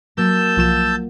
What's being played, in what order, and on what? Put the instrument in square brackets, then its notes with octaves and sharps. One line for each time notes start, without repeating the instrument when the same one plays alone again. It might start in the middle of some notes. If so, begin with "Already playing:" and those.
[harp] F#3 A#3 [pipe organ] A5 E6 G6
[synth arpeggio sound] B1 F3 E7 [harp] F4